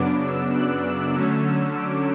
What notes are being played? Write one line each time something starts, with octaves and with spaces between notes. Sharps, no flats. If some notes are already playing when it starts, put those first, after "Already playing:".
Already playing: F#2 C#3 F#3 B3 D4 D6
E6
F#6
E6
D3 F#3 A3 C#4
E6
D6